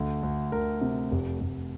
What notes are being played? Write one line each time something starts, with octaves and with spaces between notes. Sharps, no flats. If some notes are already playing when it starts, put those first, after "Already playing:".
Already playing: D2 D3
D2
D2 A#4
C3
F1
F1